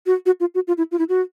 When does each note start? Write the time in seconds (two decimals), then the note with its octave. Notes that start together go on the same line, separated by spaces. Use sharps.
0.06 F#4
0.26 F#4
0.40 F4
0.55 F#4
0.68 F4
0.78 E4
0.92 F4
0.99 E4
1.09 F#4